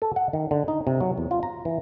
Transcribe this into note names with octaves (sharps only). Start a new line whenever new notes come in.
A4
F#5
D#3
D3
D#4
C3
F#3
E2
F4
A#5
E3